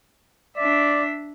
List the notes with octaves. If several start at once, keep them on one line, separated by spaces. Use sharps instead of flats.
D4 D5 E5